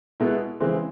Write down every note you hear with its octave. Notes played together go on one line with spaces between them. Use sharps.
B2 G#3 B3 E4
C#3 E3 G#3 C4 E4